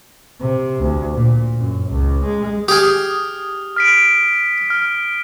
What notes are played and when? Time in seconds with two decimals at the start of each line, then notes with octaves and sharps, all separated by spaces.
0.41 C3
0.79 D2
1.14 A#2
1.59 F#2
1.88 C#2
2.25 G#3
2.68 G4 G#4 D#6 F6
3.76 F6 B6 D7
4.70 F6